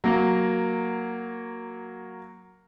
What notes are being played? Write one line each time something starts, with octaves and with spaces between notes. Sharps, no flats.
F#3 A#3